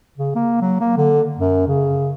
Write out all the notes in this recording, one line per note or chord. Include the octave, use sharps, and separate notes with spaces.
C#3
A#3
F#3
A#3
D3
F#2
C#3